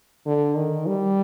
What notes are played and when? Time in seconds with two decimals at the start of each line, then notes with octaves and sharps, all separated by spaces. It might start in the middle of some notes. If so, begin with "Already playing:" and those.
0.26 D3
0.57 D#3
0.87 G3